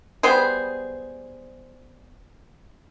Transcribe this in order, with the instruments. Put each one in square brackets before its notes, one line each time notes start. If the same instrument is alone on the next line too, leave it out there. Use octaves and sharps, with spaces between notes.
[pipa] G3 B3 G#4 C5